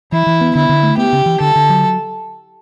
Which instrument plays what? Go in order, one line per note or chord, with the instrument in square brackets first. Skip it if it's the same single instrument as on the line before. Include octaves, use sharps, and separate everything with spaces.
[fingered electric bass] E3 [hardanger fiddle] E4
[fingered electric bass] E3
B3
[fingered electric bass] D3 [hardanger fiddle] E4
[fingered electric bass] D3
A3
[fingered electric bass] B3 [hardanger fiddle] G4
[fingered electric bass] C#3
E3
[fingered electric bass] D3 [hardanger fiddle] A4
[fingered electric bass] D3
F#3